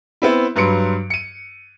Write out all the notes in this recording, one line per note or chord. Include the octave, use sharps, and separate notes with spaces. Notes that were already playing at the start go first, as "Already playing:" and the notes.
B3 C4 E4
G2 F#3 B4 C6 C#7 D7
C#7 D#7